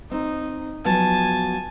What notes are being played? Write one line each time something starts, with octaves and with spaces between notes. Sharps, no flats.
C4 D#4
F3 F#3 B3 G#5 A5